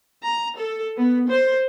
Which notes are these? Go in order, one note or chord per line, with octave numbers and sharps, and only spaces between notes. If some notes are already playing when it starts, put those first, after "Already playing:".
A#5
A4
B3
C5